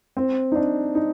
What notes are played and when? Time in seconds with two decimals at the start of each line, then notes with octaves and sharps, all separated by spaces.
0.17 C4
0.52 D#4
0.56 D4
0.95 D#4